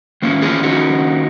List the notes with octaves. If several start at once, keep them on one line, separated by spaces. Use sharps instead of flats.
D#3 A#3 C#4
F4 G#4
D#4 F#4